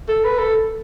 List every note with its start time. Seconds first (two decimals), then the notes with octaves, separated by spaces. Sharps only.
0.09 A4
0.25 B4
0.39 A4